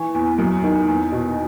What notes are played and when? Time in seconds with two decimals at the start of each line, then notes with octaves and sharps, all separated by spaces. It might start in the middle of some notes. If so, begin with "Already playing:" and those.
Already playing: E3 C#6
0.14 E2
0.38 F#2
0.64 D#3
0.87 E2
1.12 B2